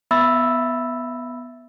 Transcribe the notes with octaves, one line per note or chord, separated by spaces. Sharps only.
B3 E5 B5 E6 A6